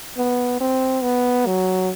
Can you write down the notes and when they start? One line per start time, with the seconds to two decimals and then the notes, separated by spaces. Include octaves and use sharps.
0.18 B3
0.61 C4
1.03 B3
1.46 F#3